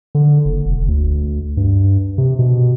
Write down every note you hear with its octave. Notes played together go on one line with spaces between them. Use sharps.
D3
F#1
E1
D2
G2
C3
B2